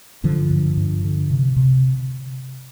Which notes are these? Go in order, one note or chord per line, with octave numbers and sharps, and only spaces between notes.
G2 D3 F3
G2
G2
D3
C3
C3